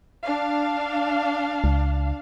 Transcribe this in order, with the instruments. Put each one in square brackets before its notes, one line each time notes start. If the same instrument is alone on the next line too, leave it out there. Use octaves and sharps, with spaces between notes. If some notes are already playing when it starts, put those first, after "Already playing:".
[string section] D4 F5
[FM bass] C#2